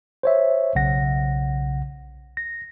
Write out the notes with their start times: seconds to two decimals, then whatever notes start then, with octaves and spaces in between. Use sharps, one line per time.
0.23 C5 C#5 E5
0.75 B1 C#3 F#5 A#6
2.37 A#6